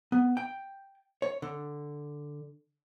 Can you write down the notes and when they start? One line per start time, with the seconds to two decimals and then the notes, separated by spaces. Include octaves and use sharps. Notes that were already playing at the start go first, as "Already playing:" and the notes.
0.12 B3
0.37 G5
1.22 C#5
1.42 D3